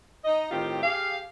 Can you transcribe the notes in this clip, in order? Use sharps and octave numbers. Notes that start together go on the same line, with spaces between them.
D#4 D#5
A2 D#3 C4 F4 G4
G4 G#4 F5